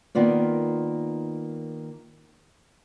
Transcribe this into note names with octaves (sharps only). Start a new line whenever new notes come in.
D#3 A#3 B3 F4 D5